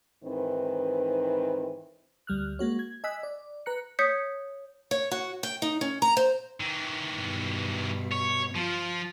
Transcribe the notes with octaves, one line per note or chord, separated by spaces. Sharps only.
G#2 D#3 E3 C4 B4
D2 G3 F6 F#6
G#3 A#3 F#4 C#5
G#6
D#5 G#5 E6 F#6 B6
D5
B4 A#5 F#6 C#7
C#5 D#6 G6 B6 C#7
C#5
F#4
G5
D#4
C#4
A#5
C5
D#3 E3
G2 B2
C#5
F3 F4